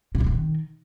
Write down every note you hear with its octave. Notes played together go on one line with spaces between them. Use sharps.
C3
B2
D#3